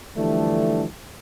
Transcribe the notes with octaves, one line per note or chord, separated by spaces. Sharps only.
D3 E3 F3 G3 A3 D4